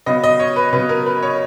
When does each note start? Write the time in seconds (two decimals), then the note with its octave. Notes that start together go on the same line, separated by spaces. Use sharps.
0.06 C#3 F#3 B3 D#5
0.24 D#5
0.40 C#5
0.56 B4
0.73 C#3 F#3 B3 B4
0.89 A#4
1.06 B4
1.23 C#5